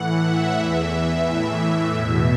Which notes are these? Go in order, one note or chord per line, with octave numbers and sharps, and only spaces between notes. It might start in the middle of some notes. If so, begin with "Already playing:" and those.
Already playing: A2 E3 F#5
E5
E2 E3
E5
A2 E3
E2 B2 E5